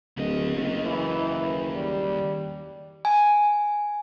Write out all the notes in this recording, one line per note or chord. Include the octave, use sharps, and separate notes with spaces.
D1 D#2 D#5
F#1
E3
G3
G#5